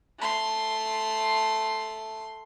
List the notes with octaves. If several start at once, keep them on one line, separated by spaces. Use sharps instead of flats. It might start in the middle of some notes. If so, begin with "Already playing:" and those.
A3 C6